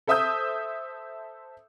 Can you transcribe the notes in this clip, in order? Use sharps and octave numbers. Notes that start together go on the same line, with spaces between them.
A4 C5 E5 D#6 E6 G6